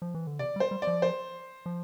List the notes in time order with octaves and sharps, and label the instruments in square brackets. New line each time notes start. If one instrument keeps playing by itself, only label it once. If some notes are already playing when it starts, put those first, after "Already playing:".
[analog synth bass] F3
E3
D3
[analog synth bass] C3 [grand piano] D5
[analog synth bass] G3
[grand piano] C5
[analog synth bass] G3
[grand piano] D5
[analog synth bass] F3
[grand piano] C5
[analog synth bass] F3